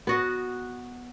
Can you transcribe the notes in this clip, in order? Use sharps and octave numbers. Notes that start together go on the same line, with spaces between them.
B3 F#4 D#5